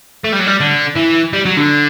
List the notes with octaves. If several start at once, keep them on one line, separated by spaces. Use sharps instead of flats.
A3
G3
F#3
G3
D3
E3
G3
F#3
D3